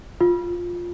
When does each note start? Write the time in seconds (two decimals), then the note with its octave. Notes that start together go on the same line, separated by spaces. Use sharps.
0.21 F4